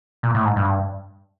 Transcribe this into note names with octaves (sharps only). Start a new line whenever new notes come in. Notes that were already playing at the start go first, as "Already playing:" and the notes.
A#2
A2
G#2
G2